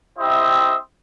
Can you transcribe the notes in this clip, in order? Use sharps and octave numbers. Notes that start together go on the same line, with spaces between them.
C4 E4 G4 C5 D#5 E5